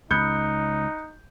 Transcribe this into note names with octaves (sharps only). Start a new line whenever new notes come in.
C#2 D#4 B5 D#6 F#6 G6 C#7